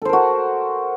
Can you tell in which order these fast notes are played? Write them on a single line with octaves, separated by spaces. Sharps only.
A4 C5 A#4 F#4